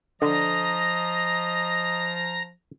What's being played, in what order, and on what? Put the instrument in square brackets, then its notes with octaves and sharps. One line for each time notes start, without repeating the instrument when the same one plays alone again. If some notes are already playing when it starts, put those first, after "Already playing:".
[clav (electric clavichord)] D3 [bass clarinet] F3 [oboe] D#5 [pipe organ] A#5